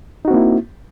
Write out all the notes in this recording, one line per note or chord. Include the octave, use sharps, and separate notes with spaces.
A#3 C4 D#4 E4 F#4